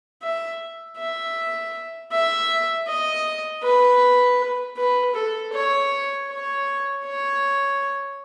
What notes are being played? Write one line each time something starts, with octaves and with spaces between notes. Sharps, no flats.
E5
E5
E5
D#5
B4
B4
A4
C#5
C#5
C#5